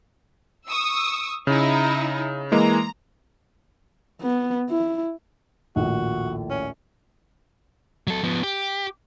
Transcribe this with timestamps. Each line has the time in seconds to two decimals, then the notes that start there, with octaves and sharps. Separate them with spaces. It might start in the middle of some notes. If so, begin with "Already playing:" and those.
0.66 C#6 D#6 E6
1.47 C#3 D#4 E4
2.52 E3 G#3 A#3 A#5
4.22 B3
4.70 E4
5.76 A#1 D#2 A2 F#4
6.50 C#4
8.07 F#3 A4
8.24 F3 B3
8.43 G4